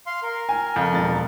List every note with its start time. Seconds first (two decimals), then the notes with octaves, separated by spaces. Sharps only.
0.06 F5 C6
0.23 A#4
0.49 G#5
0.76 F2
0.93 E1 A6